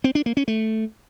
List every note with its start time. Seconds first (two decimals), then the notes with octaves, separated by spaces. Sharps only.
0.04 C4
0.15 D4
0.26 A#3
0.37 C#4
0.48 A3